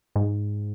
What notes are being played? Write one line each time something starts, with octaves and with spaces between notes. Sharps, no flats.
G#2